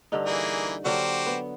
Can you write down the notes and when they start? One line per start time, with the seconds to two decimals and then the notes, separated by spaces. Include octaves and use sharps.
0.12 G2 D3 D#4
0.26 E3 A#3 G#4
0.85 D3 F#3 A#3 F#4 G4 C5
1.26 B3